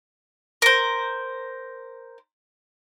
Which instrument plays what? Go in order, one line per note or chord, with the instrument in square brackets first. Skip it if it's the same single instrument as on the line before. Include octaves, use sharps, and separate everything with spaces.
[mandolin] A#4 C5